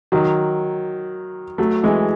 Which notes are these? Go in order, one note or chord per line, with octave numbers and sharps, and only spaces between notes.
D#3 F#3
F#3 A3
E3 G#3